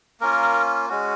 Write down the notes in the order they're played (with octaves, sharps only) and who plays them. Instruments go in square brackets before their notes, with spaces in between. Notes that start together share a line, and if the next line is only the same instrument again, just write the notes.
[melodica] A#3 C#4 F4 A#4
G#3 C#4 F#4